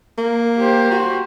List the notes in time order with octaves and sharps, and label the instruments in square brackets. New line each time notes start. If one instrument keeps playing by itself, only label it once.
[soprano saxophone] A#3
[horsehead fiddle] G4 C5
[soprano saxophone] F#4